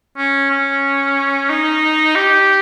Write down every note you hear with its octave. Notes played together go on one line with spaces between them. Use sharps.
C#4
C#4
D#4
G4